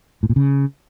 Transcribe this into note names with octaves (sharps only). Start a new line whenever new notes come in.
A2
A#2
C#3